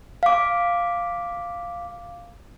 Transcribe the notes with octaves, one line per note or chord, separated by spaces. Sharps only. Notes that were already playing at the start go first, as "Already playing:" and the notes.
F5 D6